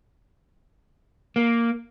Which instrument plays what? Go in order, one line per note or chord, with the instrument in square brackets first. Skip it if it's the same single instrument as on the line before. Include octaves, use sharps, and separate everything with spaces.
[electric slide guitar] A#3